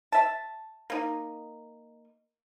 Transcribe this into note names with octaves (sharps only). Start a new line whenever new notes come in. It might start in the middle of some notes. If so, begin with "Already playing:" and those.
E5 A5
A#3 D#4